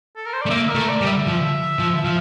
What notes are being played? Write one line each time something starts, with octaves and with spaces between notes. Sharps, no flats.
A4
A#4
C5
D5
A3
A#3 E5
A#4
A3
D5
G3
E5
F3
F3
E5
F3 F5